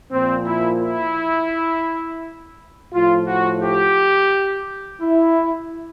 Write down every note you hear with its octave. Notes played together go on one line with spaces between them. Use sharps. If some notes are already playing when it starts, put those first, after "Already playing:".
A#2 F3 C4
E4
E4
A2 F3 F4
F#4
G4
E4